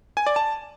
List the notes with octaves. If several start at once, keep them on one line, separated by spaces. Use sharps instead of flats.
G#5
D5
A5